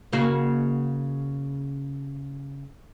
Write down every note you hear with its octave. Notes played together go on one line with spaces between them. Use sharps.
C#3 A#3 F#4